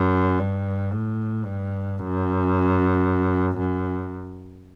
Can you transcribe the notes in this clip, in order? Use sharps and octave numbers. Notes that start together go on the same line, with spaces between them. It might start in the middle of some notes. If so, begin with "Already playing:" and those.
Already playing: F#2
G2
A2
G2
F#2
F#2